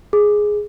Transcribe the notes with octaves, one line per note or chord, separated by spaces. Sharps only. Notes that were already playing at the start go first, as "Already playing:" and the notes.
G#4